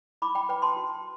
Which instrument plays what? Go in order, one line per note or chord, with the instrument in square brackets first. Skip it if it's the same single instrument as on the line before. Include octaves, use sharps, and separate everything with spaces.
[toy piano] E4 B5 D6
G5 B5
B4 G5 B5
A5 C6
F#4